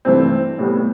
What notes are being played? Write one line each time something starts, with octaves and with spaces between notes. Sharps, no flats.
G2 E3 A3 C4
A2 G3 B3